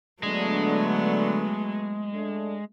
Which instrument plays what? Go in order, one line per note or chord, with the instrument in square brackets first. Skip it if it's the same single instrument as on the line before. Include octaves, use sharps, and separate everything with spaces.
[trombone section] D3 [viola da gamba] F#3 A3 B3 [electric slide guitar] G#3
[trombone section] A3 D4